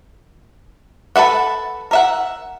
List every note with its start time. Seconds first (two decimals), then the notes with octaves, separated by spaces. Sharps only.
1.16 A4 B4 E5 F#5
1.91 A#4 E5 F#5